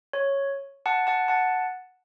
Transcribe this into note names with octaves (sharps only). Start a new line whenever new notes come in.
C#5
F#5 A5
F#5 A5
F#5 A5